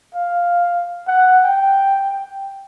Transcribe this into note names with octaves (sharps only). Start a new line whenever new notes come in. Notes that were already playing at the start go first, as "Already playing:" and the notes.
F5
F#5
G5